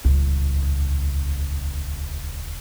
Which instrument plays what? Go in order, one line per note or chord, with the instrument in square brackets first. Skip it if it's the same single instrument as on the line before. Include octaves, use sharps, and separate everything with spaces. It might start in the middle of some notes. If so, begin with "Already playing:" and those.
[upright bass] D#1 C#2